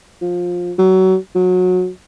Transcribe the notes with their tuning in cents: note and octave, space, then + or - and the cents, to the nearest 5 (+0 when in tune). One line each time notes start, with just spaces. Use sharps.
F3 +20
F#3 +25
F#3 -25